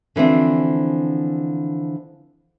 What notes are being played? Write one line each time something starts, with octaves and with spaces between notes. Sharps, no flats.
D3 E3 F3 C4 D4